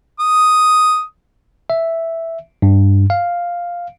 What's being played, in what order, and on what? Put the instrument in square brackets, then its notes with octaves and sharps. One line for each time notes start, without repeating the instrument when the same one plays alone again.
[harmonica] D#6
[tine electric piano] E5
G2
F5